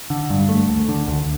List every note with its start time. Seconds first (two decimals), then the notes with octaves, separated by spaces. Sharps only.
0.10 D3
0.30 G2
0.49 A3
0.69 D2
0.89 D3
1.07 D2